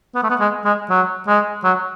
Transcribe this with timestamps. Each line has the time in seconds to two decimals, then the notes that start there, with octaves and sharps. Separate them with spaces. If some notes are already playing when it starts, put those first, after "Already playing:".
0.15 B3
0.23 A3
0.30 B3
0.40 G#3
0.65 G#3
0.90 F#3
1.28 G#3
1.64 F#3